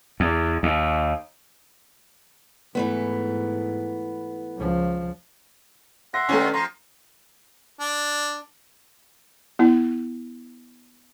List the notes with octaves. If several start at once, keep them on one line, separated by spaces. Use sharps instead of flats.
E2
D#2
G#2 E3 A3 B3
C#2 F3
E5 F#5 C6 A#6
G2 D#3 A3 C#4
F3 A#5 C6
D4
B3 E4